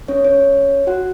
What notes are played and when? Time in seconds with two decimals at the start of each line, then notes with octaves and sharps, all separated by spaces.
0.08 C#4 C#5
0.25 C#4 C#5
0.87 F#4 F#5